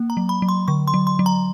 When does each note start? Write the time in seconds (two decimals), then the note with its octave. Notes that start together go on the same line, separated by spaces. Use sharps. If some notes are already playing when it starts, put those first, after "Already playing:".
Already playing: A#3
0.10 A#5
0.17 F#3
0.29 B5
0.42 F#3
0.49 C6
0.68 D3 C#6
0.88 C6
0.94 F#3
1.07 C6
1.19 F#3
1.26 A#5